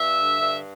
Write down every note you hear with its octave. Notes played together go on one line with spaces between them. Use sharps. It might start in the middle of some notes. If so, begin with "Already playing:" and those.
Already playing: G2 E5
D3
G2